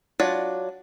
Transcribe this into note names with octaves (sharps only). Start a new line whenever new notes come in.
F#3 D4 F4 D5